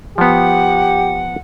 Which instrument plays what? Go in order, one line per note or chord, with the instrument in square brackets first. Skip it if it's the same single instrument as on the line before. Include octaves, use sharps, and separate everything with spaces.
[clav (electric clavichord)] F3 B3 [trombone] G4 [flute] F#5